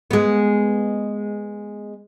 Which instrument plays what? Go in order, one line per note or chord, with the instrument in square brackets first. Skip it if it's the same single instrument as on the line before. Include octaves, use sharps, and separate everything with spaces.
[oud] G#3 B3